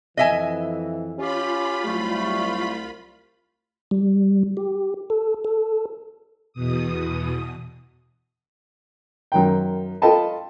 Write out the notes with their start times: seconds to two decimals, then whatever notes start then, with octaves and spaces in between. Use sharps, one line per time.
0.17 F2 E3 D#5 E5 G#5
1.18 C#4 F4 G4 B5
1.85 C2 F#3 G3 A3
3.91 G3
4.57 G4
5.10 A4
5.45 A4
6.53 E2 B2 D#6
9.32 F#2 D#3 G5
10.02 F4 A4 D#5 G5 A5 B5